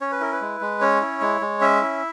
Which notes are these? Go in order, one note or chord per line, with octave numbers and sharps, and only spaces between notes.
C#4 C#5
B4
E4 A#4
B4
G#3
G#3
C#4 C#5
E4
G#3
G#3
C#4 E5
E4